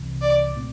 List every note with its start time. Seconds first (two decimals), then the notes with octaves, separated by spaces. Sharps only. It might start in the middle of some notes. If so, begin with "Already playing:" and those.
Already playing: C2 C3 E3
0.22 D5
0.55 A#2 A3 C4